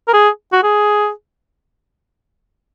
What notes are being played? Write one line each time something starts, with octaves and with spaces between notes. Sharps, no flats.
A#4
G#4
F#4
G#4